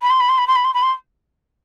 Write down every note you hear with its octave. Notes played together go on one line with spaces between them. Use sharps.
B5
C6
B5
C6
B5
C6
B5
C6
B5
C6